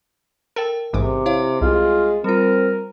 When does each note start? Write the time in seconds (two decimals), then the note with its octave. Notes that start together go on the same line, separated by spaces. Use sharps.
0.56 A4 A#4 G5
0.93 A1 G#2 C3 D6
1.26 E4 C#5 F5
1.61 C2 G#3 F4
2.24 G3 C4 F4 A#4